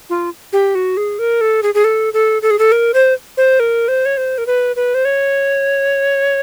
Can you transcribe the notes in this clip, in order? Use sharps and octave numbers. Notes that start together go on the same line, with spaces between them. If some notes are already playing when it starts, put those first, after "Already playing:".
F4
G4
F#4
G#4
A#4
A4
G#4
G#4
A4
A4
A4
G#4
A4
A#4
C5
C5
A#4
C5
C#5
C5
A#4
B4
B4
C5
C#5